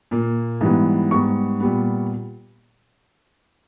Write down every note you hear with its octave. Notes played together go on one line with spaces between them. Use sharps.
A#2 A#3
G#2 E3 G3 B3
G#2 G3 B3 C#6
A#2 G3 B3